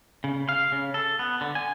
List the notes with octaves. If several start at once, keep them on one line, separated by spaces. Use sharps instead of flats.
C#3
F5
C#3
A4
B3
D3
G#5